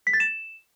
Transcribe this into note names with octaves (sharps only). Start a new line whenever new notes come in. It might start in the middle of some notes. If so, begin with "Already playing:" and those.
B6
A6
E7